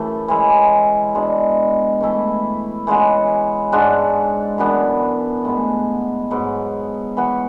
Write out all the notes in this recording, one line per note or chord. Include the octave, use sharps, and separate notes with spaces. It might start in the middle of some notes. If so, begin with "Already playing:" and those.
Already playing: F#2 C#3 E3 A3
E3 G#3 C#4 E4
B2 G#3 D4
E3 A3 E4
E3 G#3 C#4 F#4
G#2 G#3 D4 F#4
F#2 E3 B3 D4
A2 G#3 B3
G#2 F#3 B3
E3 B3 F#4